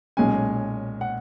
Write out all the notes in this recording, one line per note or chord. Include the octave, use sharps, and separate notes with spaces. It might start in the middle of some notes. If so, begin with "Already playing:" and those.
B1 A#2 G#3 C#4 G#5
F#5